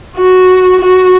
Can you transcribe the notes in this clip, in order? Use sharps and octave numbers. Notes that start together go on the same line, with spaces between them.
F#4
F#4